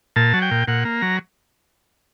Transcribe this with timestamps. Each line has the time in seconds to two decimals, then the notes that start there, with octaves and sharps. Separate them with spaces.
0.16 A#2 A5
0.34 F#3
0.42 G5
0.51 A#2
0.68 A#2 F#5
0.85 A#3
1.02 F#3 A#5